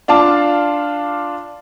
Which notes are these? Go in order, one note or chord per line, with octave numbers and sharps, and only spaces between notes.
D4 F4 F5 A5 D6